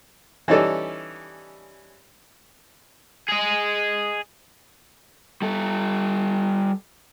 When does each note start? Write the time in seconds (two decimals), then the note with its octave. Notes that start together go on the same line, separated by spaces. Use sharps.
0.48 E3 G3 C#4 D#4 A4 D5
3.28 G#4 D#5
5.42 G3 A4